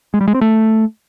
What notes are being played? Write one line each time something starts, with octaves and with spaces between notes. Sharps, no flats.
G#3
G3
G#3
C4
A3